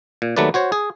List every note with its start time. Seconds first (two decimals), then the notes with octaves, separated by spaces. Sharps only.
0.22 A#2
0.36 D#2 F#3 A3 B4 D5
0.54 F#4 C5 C#5
0.72 G#4